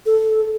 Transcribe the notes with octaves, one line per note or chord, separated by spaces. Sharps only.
A4